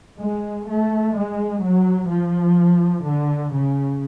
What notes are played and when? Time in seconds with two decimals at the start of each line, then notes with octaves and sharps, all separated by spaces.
0.18 G#3
0.66 A3
1.14 G#3
1.60 F#3
2.08 F3
3.04 D3
3.52 C#3